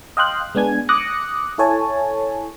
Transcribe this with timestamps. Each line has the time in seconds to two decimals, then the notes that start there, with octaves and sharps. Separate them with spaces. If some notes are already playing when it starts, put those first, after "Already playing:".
0.17 D#5 F5 G5 C6 F#6
0.55 G#3 B3 D4 G#5 G#6
0.89 D6 D#6 F#6 A#6 C#7
1.58 E4 A4 C#5 G#5 A5